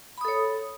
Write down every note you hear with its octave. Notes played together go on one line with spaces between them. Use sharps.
A4 C#5 B5 D#6